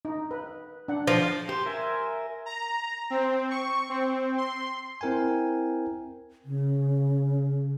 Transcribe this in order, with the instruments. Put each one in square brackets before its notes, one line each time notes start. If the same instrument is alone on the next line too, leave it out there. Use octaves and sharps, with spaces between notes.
[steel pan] D#4
B4
D4 F#5
[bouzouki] F3
[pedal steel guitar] G4 [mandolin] C5
[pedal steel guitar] A#4 E5 G#5
[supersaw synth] A#5
C4
C#6
C4
C6
[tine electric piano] C4 E4 A#4 G5 G#5
[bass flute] C#3